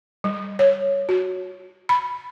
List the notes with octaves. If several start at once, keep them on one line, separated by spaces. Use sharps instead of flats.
G3
C#5
F#4
B5